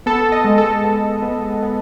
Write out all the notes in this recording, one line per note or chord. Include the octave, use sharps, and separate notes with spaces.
B3 A4
D#5
G#3
A4
B3
B3
B3